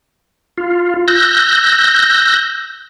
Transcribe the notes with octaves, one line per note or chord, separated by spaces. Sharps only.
F4
E6 F#6 G6 A#6